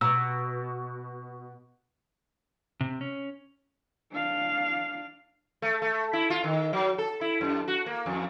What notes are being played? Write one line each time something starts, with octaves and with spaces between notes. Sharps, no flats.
B2 A#5 E6
C3
C#4
D4 F5
A3
A3
E4
F4
D#3
F#3
A4
E4
F#2
F#4
A#3
F2